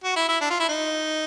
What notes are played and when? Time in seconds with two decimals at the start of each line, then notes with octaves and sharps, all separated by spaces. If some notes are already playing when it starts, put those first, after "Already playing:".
0.04 F#4
0.16 E4
0.28 E4
0.41 D4
0.50 F4
0.59 E4
0.68 D#4